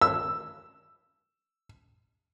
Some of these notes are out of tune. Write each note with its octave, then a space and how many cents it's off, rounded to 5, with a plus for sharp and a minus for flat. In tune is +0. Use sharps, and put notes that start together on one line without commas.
E6 +5